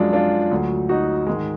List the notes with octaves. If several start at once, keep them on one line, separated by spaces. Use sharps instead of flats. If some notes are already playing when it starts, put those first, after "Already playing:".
Already playing: F#2 F3 G#3 D4 F4
D4 F4
D2 D3 F#3
D#4 F#4
G#2 D#3 G#3